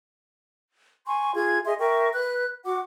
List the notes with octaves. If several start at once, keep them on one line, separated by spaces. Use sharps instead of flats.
G#5 C6 C#6
F4 G#4 G#6
G#4 D#5 E5 C6
A#4 E5 G5 C#6
B4 F#6
F#4 F#5 D6